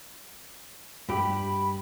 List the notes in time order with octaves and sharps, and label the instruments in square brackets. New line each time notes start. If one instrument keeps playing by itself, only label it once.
[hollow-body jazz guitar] G2 G4 [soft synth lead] B5